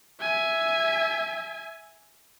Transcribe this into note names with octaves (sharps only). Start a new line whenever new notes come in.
E5 G#5